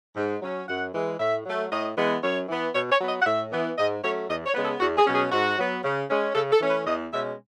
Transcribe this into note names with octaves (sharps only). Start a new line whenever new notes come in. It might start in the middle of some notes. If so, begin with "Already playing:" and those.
G#2
F#3 C#4
F#2 F#5
E3 G#3
A2 E5
F#3 A3
A2 D#5
E3 G#3 B3
F#2 C#5
E3 B3
B2 C#5
C#5
F#3 B3
D#5
F#5
A2 E5
E3 B3
G#2 D#5
F#3 A3 C#4 C#5
E2 D#5
C#5
C#3 G#3 B3
A4
E2 F#4
G#4
B2 F#3 C#4
G#4
G#2 F#4
F#3 B3
C#3
G#3 C#4
C#3 A4
A4
E3 A3 C#4
B4
E2 D#5
B2 G#3 C#4 E5